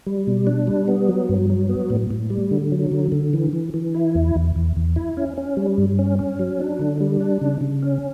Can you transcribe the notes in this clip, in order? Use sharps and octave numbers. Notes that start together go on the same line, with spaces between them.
G3
B2
D4
G3
B3
F#3
G2
F#3
B3
A2
A2
G3
D3
F#3
D3
D3
E3
E3
E3
E4
E2
E2
E2
E2
E4
C#4
C#4
G3
G2
C#4
C#4
F#3
D4
D3
G3
D4
C#3
C#3
C#4